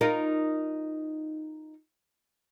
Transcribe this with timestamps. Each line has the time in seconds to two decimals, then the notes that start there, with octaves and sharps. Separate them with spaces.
0.01 D#4 F4 A#4